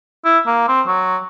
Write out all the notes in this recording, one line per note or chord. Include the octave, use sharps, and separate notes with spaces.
E4
A#3
C4
F#3